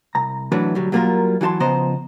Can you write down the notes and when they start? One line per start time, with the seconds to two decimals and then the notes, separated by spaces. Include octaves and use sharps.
0.15 C2 A#5
0.52 A2 E3 F#3 D4 B4
0.75 D2 F#3 G3
0.92 F#3 G3 A#3 B3 F4 A#4
1.41 E3 F#3 F4 A5 C6
1.60 C#3 F3 B3 C5 D#5 A#5